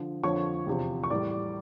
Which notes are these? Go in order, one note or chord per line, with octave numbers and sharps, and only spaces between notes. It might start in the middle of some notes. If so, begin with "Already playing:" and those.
Already playing: D3 F3
F2 D3 F3 C#5 C#6
E2 C3 F3
C#6
A2 E3 G3 D5 D6